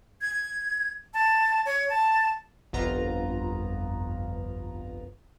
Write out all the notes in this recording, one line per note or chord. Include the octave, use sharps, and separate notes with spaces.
G#6
A5
C#5
A5
G1 C2 F2 B3 F4 A#5